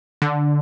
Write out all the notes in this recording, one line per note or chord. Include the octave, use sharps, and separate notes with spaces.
D3